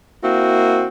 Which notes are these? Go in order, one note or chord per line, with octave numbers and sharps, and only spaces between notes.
A#3 C4 E4 F#4